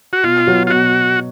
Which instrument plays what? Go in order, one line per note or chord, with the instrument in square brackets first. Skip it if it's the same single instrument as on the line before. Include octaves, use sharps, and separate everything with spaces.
[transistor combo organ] F#4
[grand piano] B2 [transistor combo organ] F4
[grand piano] F#3 B3 F#4 C#5
[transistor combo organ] F4
[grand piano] B2 [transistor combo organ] F#4